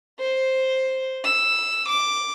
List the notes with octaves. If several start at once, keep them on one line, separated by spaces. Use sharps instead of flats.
C5
E6
D6